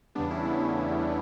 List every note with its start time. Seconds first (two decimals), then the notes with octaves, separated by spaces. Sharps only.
0.15 E2 C#3 G3 B3 D4
0.30 C#4 E4
0.45 B3
0.60 A3